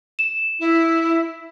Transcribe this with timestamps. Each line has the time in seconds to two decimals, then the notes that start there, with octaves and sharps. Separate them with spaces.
0.19 E7
0.60 E4